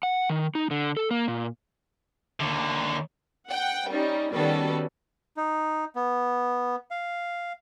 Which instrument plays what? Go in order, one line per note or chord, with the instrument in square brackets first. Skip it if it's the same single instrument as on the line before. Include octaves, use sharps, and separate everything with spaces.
[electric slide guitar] F#5
D#3
D#4
D3
A4
A#3
A#2
[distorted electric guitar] D#2 D3
[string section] F#5 G5
G3 C#4 D#4
D#3 G3 B3 C#4 F#4 A4
[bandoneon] D#4
B3
F5